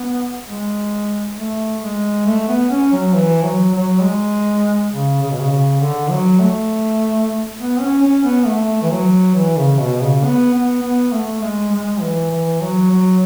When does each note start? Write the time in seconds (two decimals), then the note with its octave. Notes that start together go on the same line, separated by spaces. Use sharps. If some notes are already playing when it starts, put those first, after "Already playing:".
Already playing: B3
0.49 G#3
1.37 A3
1.82 G#3
2.26 A3
2.48 B3
2.70 C#4
2.92 F#3
3.15 E3
3.44 F#3
3.74 F#3
4.03 G#3
4.91 C#3
5.22 C#3
5.30 B2
5.40 C#3
5.51 C#3
5.81 D3
6.11 F#3
6.39 A3
7.58 B3
7.81 C#4
8.02 C#4
8.24 B3
8.46 A3
8.82 E3
8.91 F#3
9.35 E3
9.58 C#3
9.79 B2
10.02 C#3
10.24 B3
10.54 B3
10.83 B3
11.12 A3
11.42 G#3
11.72 G#3
12.01 E3
12.31 E3
12.61 F#3
12.90 F#3